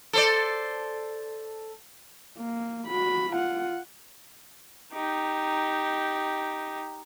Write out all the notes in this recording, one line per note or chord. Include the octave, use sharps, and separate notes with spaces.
A4 C5 D5
A#3
F#4 B5
F4 F#5
D#4 G4